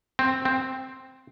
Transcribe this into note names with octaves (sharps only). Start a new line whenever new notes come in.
C4
C4